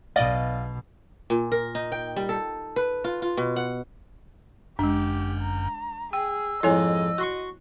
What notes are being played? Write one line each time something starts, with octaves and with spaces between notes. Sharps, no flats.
B1 B2 D5 D#5 F5 A6
A#2
A#4
D#4
G5
G3
A4
B4
F4
F4
B2
F#5
G1 F#2 G#3 D4 G4
A#5
G#4 G5 E6
F2 G#2 E4 C#5 D#5 G#5
F#4 C6 C#6